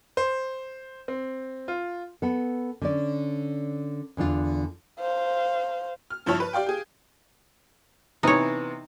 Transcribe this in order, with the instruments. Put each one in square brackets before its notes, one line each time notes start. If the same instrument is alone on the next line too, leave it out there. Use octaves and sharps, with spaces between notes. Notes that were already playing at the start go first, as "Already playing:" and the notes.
[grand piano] C5
C4
F4
[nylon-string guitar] B3 A4
D3 C#4 D5
E2 D3 D4 F4
[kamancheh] C5 F5
[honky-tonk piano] F6
G2 F3 E4 C#5 A5
B4
G4 D5 F5 G5
G4 G#4
[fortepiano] C3 E3 B3 [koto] D#4 C#5